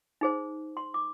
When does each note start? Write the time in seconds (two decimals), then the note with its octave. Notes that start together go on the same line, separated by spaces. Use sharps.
0.21 D#4 G#4 C5
0.77 C6
0.94 D6